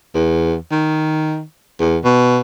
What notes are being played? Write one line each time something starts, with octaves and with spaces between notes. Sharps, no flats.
E2
D#3
E2
B2